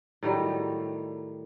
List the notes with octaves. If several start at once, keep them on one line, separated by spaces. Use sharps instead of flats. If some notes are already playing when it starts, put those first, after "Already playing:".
A2 D#3 F#3 G3